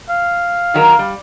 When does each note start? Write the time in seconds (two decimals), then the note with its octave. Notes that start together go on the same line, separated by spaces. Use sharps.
0.09 F5
0.74 D#3 F#3 A#4
0.99 G3